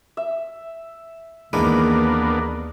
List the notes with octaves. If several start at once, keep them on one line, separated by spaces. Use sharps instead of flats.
E5
D#2 E3 G#3 A#3 B3 D4 E4